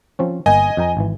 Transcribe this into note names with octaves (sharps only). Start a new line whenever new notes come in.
F3 C4 C#4
G1 A#3 D#5 G5 G#5
F2 G5 A#5
G#1 E3